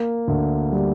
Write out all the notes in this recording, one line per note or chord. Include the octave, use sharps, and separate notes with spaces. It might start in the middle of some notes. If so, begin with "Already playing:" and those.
Already playing: A#3
D2
G3